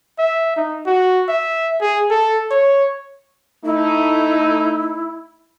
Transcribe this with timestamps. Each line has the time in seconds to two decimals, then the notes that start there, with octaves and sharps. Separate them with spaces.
0.19 E5
0.57 D#4
0.87 F#4
1.28 E5
1.81 G#4
2.11 A4
2.51 C#5
3.65 A3 D#4 E4